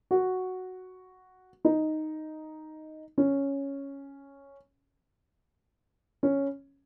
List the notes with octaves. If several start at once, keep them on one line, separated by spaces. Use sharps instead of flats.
F#4
D#4
C#4
C#4